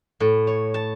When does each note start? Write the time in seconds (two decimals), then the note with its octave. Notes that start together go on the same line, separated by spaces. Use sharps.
0.20 A2
0.47 C#5
0.74 A5